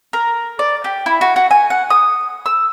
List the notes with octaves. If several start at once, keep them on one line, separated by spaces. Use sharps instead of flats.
A#4
D5
G4
E4
F#4
F#4
G#5
F#5
D#6
E6